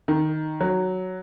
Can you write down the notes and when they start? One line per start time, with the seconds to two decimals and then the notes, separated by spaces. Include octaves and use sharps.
0.08 D#3
0.61 F#3